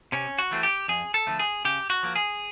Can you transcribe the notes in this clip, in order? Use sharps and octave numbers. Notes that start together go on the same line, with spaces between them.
C3 C#4
F#4
E3 A3 C4
G4
F2 G#4
A4
D3 F3 A3
G#4
C#3 G4
F#4
F3 A#3
G#4